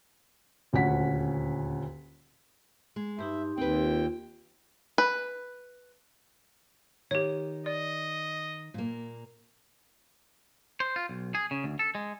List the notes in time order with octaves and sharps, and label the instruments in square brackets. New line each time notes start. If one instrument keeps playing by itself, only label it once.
[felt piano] D#1 D2 C#4 F#5 B6
[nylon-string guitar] G#3
[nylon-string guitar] G2 [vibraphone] D#4 G4 C6 [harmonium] E5
[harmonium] D#2 G5 [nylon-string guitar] C4 B4
[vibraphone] F4
[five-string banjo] B4
[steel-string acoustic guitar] D#3 [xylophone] G4 C#5
[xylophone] D5 [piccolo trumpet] D#5
[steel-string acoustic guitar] A#2 A#3
[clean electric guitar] C5
F4
B1
G#4
C#3
D2
A4
G#3